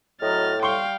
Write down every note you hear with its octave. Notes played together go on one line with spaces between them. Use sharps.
A2 F#3 D#5 F6 A6
G3 F5 G5 C6 C#6 G7